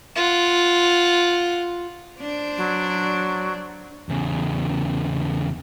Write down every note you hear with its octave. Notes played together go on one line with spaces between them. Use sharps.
F4 F#5
D4 C5 D5
F#3
E2 C#3